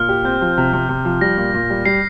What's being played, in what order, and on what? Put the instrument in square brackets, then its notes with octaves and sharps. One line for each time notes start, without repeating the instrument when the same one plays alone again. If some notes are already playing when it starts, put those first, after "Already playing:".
Already playing: [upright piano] A#2 [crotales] F6
[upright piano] G4
[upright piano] C4 [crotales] G6
[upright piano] F3
C3
C3
C3
F3
[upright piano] G3 [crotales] A#6
[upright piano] A#2
A#2
G3
[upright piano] G3 [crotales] C7